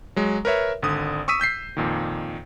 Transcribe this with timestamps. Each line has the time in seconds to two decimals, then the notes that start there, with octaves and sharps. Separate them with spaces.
0.16 F#3 G#3
0.45 A#4 B4 C#5 E5
0.82 G#1 D3 D#6
1.28 C#6 D#6 E6 B6 D#7
1.40 E6 G6 B6 C7
1.77 F2 A#2 D#3